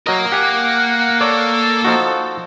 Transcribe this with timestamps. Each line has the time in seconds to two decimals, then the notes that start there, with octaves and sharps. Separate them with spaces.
0.07 F#3 A#3 A#4 D#5
0.32 G4 F#5 G#5
1.21 A4 C#5 D5
1.84 F3 D#4 F#4